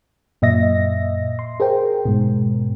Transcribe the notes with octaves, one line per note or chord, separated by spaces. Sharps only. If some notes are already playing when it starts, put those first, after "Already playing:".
F#2 A#2 D#5 E5 A#6
C6
G#4 A#4 C5 G5
G#2 B2